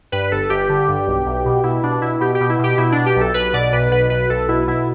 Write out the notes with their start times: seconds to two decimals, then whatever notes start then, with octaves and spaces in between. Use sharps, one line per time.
0.12 G2 B4
0.32 G1 A4
0.50 G1 G4
0.69 D3
0.88 G2
1.07 B1
1.26 B1
1.46 B2
1.63 B2 E4
1.83 B2 D4
2.02 B2 E4
2.20 B2 G4
2.35 G4
2.40 B2
2.49 E4
2.59 B2 G4
2.78 B2 E4
2.92 B2 D4
3.06 G4
3.16 B1 A4
3.34 B1 B4
3.53 B2 D5
3.73 B1 B4
3.91 B2 B4
4.10 B1 B4
4.30 B1 A4
4.48 B2 E4
4.68 B2 E4